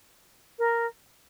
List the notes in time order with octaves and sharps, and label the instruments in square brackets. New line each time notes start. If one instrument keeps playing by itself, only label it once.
[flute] A#4